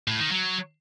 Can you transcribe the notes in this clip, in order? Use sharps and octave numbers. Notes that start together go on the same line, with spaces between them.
A2
D#3
F#3